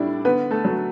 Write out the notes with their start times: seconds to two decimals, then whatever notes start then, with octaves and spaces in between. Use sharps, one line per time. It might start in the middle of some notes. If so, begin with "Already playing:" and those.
Already playing: A2 G3 D4 E4 D5
0.25 D3 B3 B4
0.51 A3 A4
0.64 F#3 A3